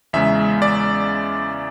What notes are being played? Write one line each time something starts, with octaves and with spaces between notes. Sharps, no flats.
E2 C#3 G#3 E5
D5